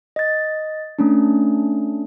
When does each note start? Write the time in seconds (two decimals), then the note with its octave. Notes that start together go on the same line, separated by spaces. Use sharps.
0.16 D#5 A6
0.99 A3 C#4 D4